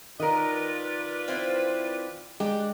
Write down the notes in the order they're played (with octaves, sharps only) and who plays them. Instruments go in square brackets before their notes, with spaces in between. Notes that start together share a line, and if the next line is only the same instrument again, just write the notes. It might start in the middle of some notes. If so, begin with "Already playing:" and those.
[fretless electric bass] D#3 [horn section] F4 B4 D5 [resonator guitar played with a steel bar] A#4 D#5
[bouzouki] F3 C4 E4
[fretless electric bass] G#3 [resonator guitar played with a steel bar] D4 [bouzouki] G4